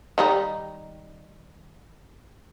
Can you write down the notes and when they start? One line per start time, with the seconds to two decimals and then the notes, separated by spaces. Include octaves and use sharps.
0.18 D#3 G3 D#4